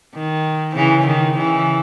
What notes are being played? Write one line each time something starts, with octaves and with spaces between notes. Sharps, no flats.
D#3
C#3 E3
D#3
C#3 E3